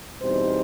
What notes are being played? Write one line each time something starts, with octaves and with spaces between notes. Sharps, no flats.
E2 B2 G3 C4 D#4 C5